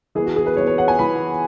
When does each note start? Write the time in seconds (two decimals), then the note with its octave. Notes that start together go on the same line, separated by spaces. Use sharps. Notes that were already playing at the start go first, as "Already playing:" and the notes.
0.15 E3 B3 G#4
0.26 F#4
0.36 G#4
0.47 B4
0.56 E3 B3 C#5
0.67 C#5
0.78 F#5
0.88 G#5
0.99 E3 B3 B5